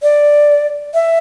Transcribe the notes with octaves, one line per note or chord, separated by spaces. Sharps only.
D5
E5